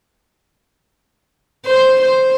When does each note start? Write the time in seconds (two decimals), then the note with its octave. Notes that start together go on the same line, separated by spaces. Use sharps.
1.65 C5
2.02 C5